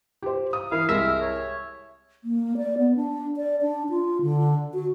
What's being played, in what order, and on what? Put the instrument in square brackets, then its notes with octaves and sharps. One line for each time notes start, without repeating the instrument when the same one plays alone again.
[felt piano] G4 C5
F5 D#6
[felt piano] E3 E4 A#4 [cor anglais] F5
[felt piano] C2 G#3 [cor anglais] A#4 [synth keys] E5
[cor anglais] C#5
[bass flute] A#3
D5
B3
D4
D5
D4
F4
D3
F#4